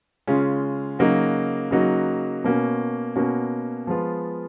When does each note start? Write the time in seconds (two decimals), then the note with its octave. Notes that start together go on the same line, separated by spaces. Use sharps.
0.27 C#3 G#3 C#4 F4
0.99 C#3 F#3 A#3 D#4 F#4
1.71 C#3 F#3 A#3 D#4 F#4
2.44 B2 A#3 C#4 F#4
3.15 B2 A#3 C#4 F#4
3.87 F3 G#3 B3 F4